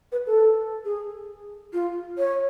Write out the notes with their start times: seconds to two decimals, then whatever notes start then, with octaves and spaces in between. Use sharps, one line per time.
0.12 B4
0.26 A4
0.85 G#4
1.73 F4
2.18 C#5